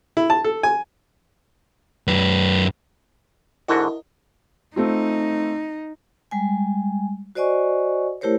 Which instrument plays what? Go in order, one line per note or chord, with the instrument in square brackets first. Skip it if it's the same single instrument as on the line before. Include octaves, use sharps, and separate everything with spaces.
[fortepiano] E4
A5
A4
G#5
[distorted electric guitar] F#2 B4
[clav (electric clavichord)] G#2 D3 F#4 [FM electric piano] E4 A#4 D#5
[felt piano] A3 C4 F4 [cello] D#4
[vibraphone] G3 G#3 G#5
F#4 C5 D5 D#5 G#5 C#6
A3 E4 G4 A#4 C5 C#5